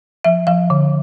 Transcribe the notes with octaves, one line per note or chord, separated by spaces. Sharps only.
F3 E5
F3 F5
D3